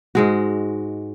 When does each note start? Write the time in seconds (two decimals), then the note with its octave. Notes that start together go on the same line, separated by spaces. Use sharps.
0.15 G#2 G#3 F#4